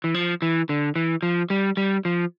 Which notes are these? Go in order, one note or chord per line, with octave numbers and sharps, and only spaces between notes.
E3
F3
E3
D3
E3
F3
G3
G3
F3